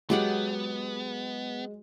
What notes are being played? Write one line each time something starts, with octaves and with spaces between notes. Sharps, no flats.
F#3 G#3 B3 G4 F#5